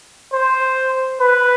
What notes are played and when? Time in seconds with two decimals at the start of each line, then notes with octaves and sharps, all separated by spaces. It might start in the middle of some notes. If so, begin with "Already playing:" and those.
0.33 C5
1.21 B4